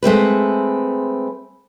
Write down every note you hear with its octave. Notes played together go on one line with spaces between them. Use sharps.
G#3 A3 C4 B4